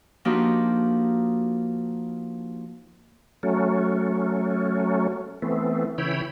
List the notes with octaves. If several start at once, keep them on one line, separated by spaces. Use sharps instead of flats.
F3 A#3 D4 D#4 F#4 G4
F#3 A3 C#4
E3 A3 B3 C4
C#3 E3 E4 C#5 G5 B5